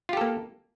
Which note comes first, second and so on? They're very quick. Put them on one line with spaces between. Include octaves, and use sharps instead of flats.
F4 G4 A4 A#3